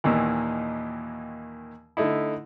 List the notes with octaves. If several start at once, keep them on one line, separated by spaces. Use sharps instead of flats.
D#2 A#2 D#3 E3
D3 A3 D#4 E4